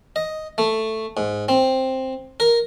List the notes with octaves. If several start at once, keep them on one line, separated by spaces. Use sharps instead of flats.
D#5
A3
G#2
C4
A#4